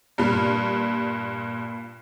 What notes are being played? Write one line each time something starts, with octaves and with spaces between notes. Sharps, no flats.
G2 A#2